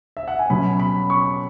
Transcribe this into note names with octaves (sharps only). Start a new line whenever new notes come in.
E5
F#5
G#5
B2 F#3 C#4 B5
B5
C#6